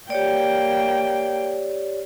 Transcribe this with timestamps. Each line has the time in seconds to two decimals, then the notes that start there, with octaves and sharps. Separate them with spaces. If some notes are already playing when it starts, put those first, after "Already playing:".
0.10 A#3 G4 C#5 D5 G5